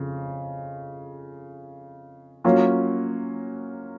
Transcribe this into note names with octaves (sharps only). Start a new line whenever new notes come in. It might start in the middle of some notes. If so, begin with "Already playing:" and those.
Already playing: F2 C#3
F#3 A#3 C#4 F4